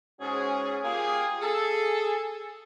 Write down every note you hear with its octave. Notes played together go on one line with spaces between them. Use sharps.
G#2 C#4 F#4 G#4
A#3 F4 G4 G#4
G#4 A4